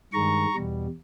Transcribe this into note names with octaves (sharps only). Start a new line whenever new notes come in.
G2 D#3 G#3 A#5 C#6
E2 B2 G3